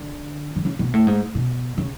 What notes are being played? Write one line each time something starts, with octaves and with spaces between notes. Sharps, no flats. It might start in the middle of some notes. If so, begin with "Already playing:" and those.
Already playing: D3
D3
C#3
B2
A2
G#2
B2
C#3